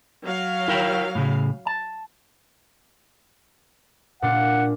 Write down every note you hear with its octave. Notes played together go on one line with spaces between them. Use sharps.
F#3 F5
E4 A#4 G5
A2 C#3
A5
A#2 D4 F#5